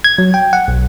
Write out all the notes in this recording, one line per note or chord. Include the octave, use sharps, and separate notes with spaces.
G#6
F#3
G5
F#5
B1